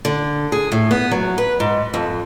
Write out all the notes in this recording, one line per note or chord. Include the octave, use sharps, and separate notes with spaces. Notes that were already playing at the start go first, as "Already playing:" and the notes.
D3
G#4
A2
B3
F#3
B4
G#2
F2